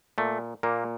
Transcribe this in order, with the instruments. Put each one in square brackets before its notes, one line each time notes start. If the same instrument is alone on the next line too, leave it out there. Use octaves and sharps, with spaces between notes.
[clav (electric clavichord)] A#2 A3
A#2 A#3